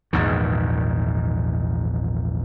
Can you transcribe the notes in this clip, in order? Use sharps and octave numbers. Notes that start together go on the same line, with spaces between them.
A#1 E2 G#2 D#3